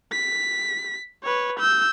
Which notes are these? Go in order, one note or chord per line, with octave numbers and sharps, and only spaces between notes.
B6
B4 C#5
E6 G6